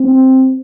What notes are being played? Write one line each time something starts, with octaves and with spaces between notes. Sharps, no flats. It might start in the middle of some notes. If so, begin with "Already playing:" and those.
Already playing: C4